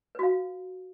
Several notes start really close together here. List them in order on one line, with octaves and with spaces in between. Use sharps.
B4 F#4 F5